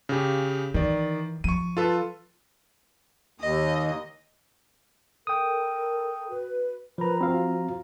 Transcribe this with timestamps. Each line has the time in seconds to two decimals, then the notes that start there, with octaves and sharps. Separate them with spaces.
0.09 C#3 G4
0.74 D#3 E3 D5
1.44 F3 C#6 D#7
1.77 F4 A4 B4
3.40 D#2 D#5
5.27 A4 A#4 G5 D#6
6.29 F#4 B4
6.98 F3 A#4 B4 A#5 B5
7.21 C4 F4 F#4 F5